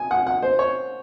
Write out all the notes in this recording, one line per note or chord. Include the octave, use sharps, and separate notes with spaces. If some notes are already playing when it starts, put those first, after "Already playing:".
Already playing: G#5
F#5
F#5
C5
C#5